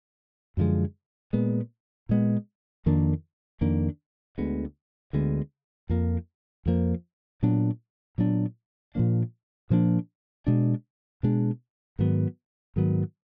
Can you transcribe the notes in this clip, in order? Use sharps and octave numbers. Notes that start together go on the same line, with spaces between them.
F#2 D3 F3 G#3
A#2 G#3 B3
A#2 G#3 B3
F2 D#3 A#3 D4
F2 D#3 A#3 D4
D2 D3 G#3 B3
D2 D3 G#3 B3
F2 F3 A#3
F2 F3 A#3
A#2 F#3 B3 D4
A#2 F#3 B3 D4
A#2 F3 A#3 D4
A#2 F3 A#3 D4
B2 G#3 D4
B2 G#3 D4
G#2 D#3 F#3 B3
G#2 D#3 F#3 B3